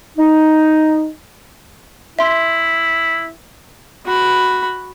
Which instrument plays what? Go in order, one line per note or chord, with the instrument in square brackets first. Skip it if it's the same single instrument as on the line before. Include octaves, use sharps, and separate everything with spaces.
[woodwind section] D#4
[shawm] E4 [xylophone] E5 C6
[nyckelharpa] F#4 B5